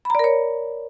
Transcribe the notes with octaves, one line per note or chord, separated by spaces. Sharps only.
A#4 C#5 D5 A#5 B5